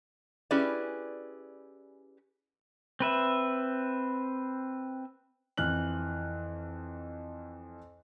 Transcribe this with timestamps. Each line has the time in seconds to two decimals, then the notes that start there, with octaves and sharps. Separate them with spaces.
0.51 C#4 E4 G4 G#4 B4 D5
3.00 C4 B4 E5
5.57 F2 E3 F6 F#6 F#7